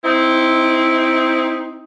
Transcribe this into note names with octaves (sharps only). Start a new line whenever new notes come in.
C4 D#4 E4